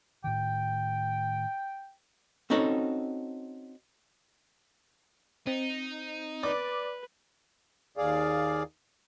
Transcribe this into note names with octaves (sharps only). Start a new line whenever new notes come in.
A2 D#3 G5
C4 C#4 D#4 F#4 A4
C4 D#4
B4 D5 D6
D#2 G#4 D5 F5